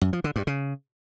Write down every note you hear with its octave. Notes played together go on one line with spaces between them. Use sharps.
F#2
F3
D3
G2
C#3